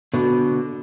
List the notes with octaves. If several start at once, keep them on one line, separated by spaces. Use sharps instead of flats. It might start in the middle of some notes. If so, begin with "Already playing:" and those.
B2 D3